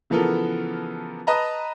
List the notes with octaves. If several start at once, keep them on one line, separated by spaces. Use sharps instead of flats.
C#3 E3 F3 B3 A4 A#4
B4 D#5 A5 A#5